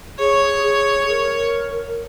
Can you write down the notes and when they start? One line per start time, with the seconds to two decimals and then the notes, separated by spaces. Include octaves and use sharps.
0.19 G#4 C#5
0.63 G#4
1.09 A#4